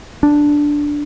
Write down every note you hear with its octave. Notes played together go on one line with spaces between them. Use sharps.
D4